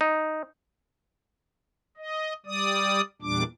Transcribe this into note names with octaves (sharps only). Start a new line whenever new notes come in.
D#4
D#5
G3 D5 D#6
E2 A#2 G3 D4 D6